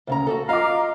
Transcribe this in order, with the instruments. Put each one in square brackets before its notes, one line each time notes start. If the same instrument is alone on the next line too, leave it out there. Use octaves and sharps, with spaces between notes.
[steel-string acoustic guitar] D2 C#3 A#5
F#4 G4 A4
[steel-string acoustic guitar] F4 D#5 [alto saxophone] F5 [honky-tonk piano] A#5 D6